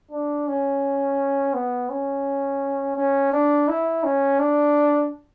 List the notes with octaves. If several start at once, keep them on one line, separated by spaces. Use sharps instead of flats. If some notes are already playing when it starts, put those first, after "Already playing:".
D4
C#4
B3
C#4
C#4
D4
E4
C#4
D4